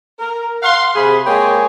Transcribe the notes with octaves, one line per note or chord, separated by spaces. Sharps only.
A#4
F5 F#5 C6
C3 G#4 B5
G#3 A#3 C#5 G5 G#5